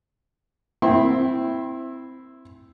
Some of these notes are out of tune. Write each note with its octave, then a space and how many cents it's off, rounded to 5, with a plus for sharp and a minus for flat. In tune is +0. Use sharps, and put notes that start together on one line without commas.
C4 -5 E4 +0 C6 +40